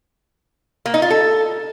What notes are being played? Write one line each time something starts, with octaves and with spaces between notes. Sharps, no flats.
A#3
D#4
F4
A4